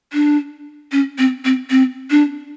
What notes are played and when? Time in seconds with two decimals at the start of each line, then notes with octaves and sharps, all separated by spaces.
0.13 D4
0.92 C#4
1.18 C4
1.45 C4
1.70 C4
2.11 D4